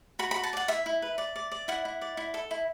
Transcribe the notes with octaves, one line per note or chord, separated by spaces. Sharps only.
F#4 B5
F#4 B5
A5
D5 F#5
E4 E5
E4
B4
D5
D5
D5
E4 F#5
E4
D5
E4
A4
E4